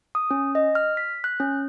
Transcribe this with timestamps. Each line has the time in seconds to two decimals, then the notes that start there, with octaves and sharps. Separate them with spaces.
0.15 D#6
0.31 C#4
0.55 D#5
0.75 F6
0.97 B6
1.24 F#6
1.40 C#4